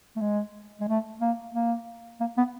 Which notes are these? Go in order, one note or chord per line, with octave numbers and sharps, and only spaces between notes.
A3
G#3
G#3
A3
A#3
A#3
A#3
B3